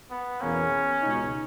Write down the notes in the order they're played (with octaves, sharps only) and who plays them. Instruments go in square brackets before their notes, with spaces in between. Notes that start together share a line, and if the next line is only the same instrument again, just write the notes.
[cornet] B3
[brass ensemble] E2 B2 A#3 [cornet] C#4
[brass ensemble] C#2 B2 G#3 D#4